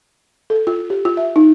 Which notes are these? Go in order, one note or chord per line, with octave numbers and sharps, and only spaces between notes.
A4
F4
G4
F4
E5
D#4